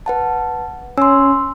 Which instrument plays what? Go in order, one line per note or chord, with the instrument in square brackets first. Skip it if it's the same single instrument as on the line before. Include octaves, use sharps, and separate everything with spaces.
[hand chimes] B4 F#5 A5
[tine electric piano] C#4 [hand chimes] C6 E6